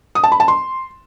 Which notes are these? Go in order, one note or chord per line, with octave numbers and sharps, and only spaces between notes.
D#6
A5
B5
A5
C6